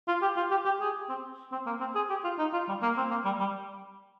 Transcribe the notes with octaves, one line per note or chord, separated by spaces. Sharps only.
F4
G4
F4
G4
G4
G#4
C4
C4
A#3
C4
G#4
G4
F4
D#4
F4
G3
A#3
C4
A#3
G3
G3